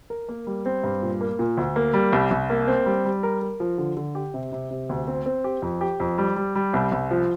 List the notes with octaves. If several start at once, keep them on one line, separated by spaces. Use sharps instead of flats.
A#4
A#3
G3
C4
G2
A#2
A#3
A#2
D2
A#3
G3
C2
C2
A#3
C4
G3
G3
A#4
A#4
F3
D3
D3
G4
C3
C3
C3
D2
C4
C4
G4
F2
G4
F2
G3
G3
G3
C2
C2
F3